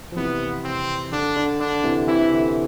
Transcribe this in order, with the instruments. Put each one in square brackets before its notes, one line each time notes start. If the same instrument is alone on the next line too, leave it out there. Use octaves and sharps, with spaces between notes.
[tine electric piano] F3
[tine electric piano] C3 E3 [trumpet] B3
[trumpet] C4
[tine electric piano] D3 [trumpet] D4
[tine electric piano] D3
[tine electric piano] D3 [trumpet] D4
[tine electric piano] C3 E3
[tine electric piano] C3 E3 [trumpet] E4
[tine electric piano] E3
D3